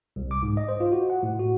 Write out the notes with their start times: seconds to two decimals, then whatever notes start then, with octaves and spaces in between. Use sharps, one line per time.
0.16 C2
0.31 D6
0.42 G#2
0.57 D#5
0.68 C5
0.80 F4
0.92 F#4
1.10 F#5
1.23 A2
1.39 F#4